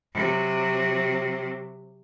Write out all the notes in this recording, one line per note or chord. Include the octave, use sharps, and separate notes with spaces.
C3 F#3